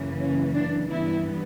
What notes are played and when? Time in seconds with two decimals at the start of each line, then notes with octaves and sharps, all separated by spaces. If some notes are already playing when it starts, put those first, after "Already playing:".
Already playing: F#2 C#3 E3 A#3
0.19 C#4
0.54 D4
0.89 G2 E3 B3 E4